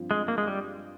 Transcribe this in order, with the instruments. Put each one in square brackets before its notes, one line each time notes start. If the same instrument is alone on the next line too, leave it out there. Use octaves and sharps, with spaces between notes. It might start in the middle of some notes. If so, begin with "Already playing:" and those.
Already playing: [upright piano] G2 F3 C4
[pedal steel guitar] G#3
A#3
G#3
G3